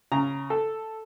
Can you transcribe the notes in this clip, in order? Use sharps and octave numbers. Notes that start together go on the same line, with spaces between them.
C#3 A#5
A4